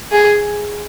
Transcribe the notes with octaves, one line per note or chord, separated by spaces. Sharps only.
G#4